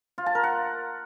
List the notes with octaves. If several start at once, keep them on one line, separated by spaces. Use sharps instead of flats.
F4
A5
A#4
F#5